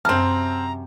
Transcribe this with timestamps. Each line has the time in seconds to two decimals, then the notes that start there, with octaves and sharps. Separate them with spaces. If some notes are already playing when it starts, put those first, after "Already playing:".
0.05 F#2 C3 C4 A5 A#5 F6